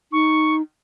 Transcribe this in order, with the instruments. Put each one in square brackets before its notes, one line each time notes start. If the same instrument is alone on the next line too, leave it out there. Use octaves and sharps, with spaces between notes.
[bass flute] D#4 [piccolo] C#6